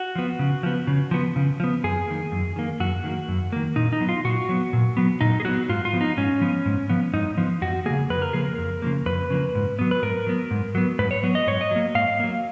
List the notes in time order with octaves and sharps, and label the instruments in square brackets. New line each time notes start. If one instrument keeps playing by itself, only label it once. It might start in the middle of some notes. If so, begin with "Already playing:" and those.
Already playing: [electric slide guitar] F#4
F3 B3
C#3
F3 B3
C#3
F3 B3
C#3
F3 B3
F#2 G#4
D#3 A#3
F#2
D#3 A#3
F#2 F#4
D#3 A#3
F#2
D#3 A#3
A#2 D#4
D#4
F#3 B3
F4
A#2 F#4
F#3 B3
A#2
F#3 B3
A#2 D#4
G#4
F#3 B3 F#4
G#2 F4
F4
F3 B3
D#4
G#2 C#4
F3 B3
G#2
F3 B3
G#2 D#4
F3 B3
F2 F#4
C#3 F3 A#3 G#4
F2 B4
A#4
C#3 F3 A#3 G#4
A#4
F2
C#3 F3 A#3
F2 B4
C#3 F3 A#3
G#2
F#3 B3
B4
G#2 A#4
F#3 B3
G#2
F#3 B3
G#2 B4
C#5
F#3 B3
D#5
G#2 C#5
D#5
F#3 A#3
G#2 F5
F#3 A#3